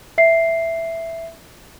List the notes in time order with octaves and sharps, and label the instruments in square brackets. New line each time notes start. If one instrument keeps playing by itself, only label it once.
[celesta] E5 C7